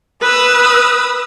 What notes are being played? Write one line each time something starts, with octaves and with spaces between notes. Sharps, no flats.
B4 D#6 E6